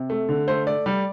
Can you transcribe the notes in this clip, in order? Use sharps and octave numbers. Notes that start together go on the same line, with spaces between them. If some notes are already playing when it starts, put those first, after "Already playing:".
Already playing: C3
A3
D3
A3 C5
A3 D5
G3